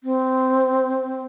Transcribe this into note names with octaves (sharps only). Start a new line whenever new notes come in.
C4